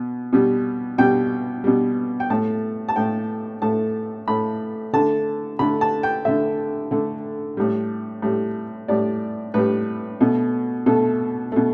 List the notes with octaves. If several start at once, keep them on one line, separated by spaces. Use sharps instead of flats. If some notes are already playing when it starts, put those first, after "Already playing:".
Already playing: B2
B2 G3
B2 G3 G5
B2 G3
G5
A2 A3 A5
A5
A2 A3 G5
A2 A3 A5
A2 A3 B5
D3 A3 A5
D3 A3 B5
A5
G5
D3 A3 E5
D3 A3
A2 G3
A2 G3
A2 G3 D5
A2 G3 B4
B2 A3
B2 A3 A4
B2 A3